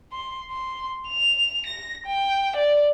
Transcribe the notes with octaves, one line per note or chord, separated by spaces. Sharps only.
C6
C6
F7
A#6
G5
D5